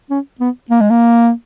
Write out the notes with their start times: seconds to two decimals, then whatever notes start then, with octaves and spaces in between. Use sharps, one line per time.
0.10 C#4
0.40 B3
0.70 A#3
0.81 G#3
0.90 A#3